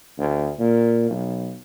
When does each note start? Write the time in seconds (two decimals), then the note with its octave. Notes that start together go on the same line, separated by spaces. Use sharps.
0.18 D2
0.59 A#2
1.10 B1